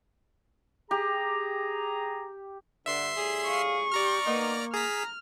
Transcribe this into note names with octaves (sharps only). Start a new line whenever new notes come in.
G4 G#4 A#5
G2 D3 E5 C6 C7
A2 G3 G#4
F5 C#6
G4 D5 A#5 F6
A#3 B3 D#4
G#4 A#5 F6 B6